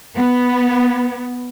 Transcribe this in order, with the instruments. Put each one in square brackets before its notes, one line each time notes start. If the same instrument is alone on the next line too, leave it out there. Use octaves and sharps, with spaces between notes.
[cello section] B3